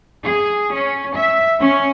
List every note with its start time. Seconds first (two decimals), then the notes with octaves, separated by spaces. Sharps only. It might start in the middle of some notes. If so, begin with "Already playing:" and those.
0.23 G#4
0.71 C#4
1.15 E5
1.59 C#4